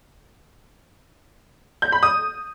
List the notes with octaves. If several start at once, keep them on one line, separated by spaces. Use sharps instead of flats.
G6
B5
D#6